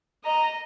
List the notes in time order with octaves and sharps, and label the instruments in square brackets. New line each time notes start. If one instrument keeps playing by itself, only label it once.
[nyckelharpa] D#5 [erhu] A#5